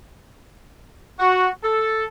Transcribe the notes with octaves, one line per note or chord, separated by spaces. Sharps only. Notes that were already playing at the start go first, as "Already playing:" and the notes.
F#4
A4